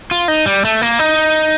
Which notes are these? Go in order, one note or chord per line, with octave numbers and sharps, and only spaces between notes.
F4
D#4
G3
A3
A#3
D#4